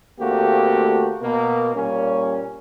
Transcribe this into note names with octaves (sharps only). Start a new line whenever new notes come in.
D2 A3 A#3 C4 F#4 G4
B2 A#3
A#2 G3 A#3 C#4